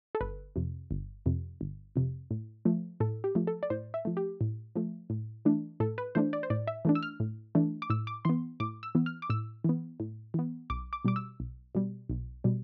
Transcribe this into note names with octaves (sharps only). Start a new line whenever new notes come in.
A4
G1 B4
F2 C3
G1
F2 C3
G1
F2 C3
A2
F3 A3
A2 A4
G4
F3 A3
A4
D5
A2 C5
E5
F3 A3
G4
A2
F3 A3
A2
E3 A3 D4
A2 A4
B4
E3 A3 D4 C5
D5
C5
A2 D5
E5
E3 A3 D4
E6
F6
A2
E3 A3 D4
D6
A2 E6
D6
E3 B3 C6
A2 D6
E6
E3 B3
F6
D6
A2 E6
E3 B3
A2
E3 B3
B1 D6
D6
B2 G3 D6
E6
B1
B2 G3
B1
B2 G3